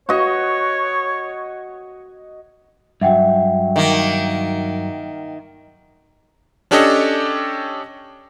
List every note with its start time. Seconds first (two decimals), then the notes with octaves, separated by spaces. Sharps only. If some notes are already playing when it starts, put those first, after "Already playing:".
0.09 F#4 C#5 D#5
3.01 G2 F#3 E5 F#5 G5
3.76 D#3 A#3
6.71 C#4 D4 G4 A4 C#5 D#5